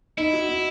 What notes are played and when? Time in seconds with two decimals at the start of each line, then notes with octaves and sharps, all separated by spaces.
0.18 D#4 E4
0.33 F#4
0.49 D#4